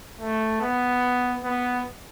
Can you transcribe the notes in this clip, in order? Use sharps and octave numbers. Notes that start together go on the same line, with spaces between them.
A3
B3
B3